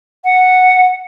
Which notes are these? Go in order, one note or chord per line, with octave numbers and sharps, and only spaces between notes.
F#5